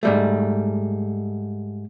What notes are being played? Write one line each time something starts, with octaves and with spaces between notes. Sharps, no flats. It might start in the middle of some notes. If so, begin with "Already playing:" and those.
G#2 G3 A3